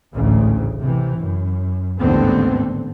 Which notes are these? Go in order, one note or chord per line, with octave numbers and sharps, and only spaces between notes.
A1 D2 G#2 C#3
C3 E3
F#2
A1 D#2 G#2 D3 B3 C4